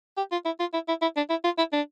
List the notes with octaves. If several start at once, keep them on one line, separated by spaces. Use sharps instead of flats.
G4
F4
E4
F4
E4
E4
E4
D4
E4
F4
E4
D4